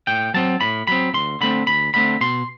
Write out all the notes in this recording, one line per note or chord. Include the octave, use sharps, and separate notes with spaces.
A2 G5
F#3 C4 A5
A2 B5
F#3 C4 B5
D2 C6
D3 A3 C4 B5
D2 B5
D3 A3 C4 B5
B2 C6